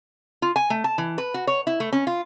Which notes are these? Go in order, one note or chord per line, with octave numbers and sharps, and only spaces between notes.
F4
G#5
A3
A5
E3
B4
F#4
C#5
E4
A3
C#4
F4